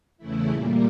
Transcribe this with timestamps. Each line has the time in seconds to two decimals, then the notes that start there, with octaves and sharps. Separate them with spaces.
0.18 E2 C#3 E3 A3 E4
0.49 A#2 G3 A#3